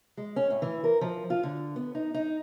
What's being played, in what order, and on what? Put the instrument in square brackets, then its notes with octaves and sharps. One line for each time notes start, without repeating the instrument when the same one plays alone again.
[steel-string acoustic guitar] G#3
C#4
A2
E3
A#4
F3
F4
D3
B3
D#4
D#4